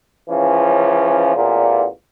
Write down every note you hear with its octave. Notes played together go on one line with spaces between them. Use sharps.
C#2 E3 F3 C#4
A1 E2 A#2